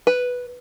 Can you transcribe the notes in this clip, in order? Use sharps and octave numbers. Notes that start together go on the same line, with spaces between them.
B4